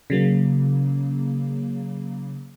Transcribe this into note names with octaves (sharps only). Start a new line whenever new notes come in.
C#3 F#3 A#3